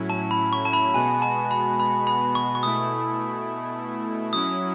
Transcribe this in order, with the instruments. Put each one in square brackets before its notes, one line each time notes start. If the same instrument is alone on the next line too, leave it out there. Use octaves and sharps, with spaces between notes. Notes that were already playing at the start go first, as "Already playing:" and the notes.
Already playing: [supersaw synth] A2 F#3 C#4 E4
[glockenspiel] A5
B5
C#6
A5
B5
[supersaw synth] B2 G#3 B3 F#4 [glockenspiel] G#5
[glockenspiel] A5
B5
B5
B5
C#6
C#6
[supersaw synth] B2 A3 E4 [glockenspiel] D#6
[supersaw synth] F#3 C#4 E4 [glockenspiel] D#6